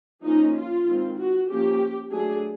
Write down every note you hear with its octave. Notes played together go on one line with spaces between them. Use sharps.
F3 A#3 C#4 D#4
F4
D#3 G#3 C4
F#4
F3 A#3 C#4 G4
F#3 A3 D4 G#4